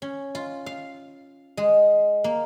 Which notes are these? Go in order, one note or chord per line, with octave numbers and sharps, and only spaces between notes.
C#4
F4
F5
G#3
A#3